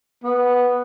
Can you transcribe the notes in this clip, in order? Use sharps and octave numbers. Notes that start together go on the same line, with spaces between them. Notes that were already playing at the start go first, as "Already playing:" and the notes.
B3